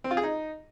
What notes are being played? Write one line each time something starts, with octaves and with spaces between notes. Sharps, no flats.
C4
F4
G#4
D#4